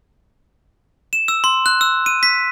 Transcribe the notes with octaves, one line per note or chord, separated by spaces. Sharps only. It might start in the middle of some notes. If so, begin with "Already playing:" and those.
E7
E6
C6
F#6
E6
D#7
B6